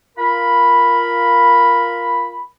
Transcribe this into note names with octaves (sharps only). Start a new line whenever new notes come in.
F4 A#4 B5